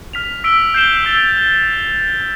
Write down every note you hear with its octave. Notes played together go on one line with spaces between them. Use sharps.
F6 B6 F7
E6 B6 D7 G7
G6 C7 E7 G7
E6 A6 D7 F7